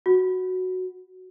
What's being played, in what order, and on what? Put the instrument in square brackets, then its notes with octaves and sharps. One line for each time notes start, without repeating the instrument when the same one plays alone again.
[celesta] F#4